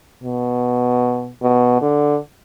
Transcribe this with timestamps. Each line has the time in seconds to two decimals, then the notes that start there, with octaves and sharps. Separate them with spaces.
0.23 B2
1.42 B2
1.81 D3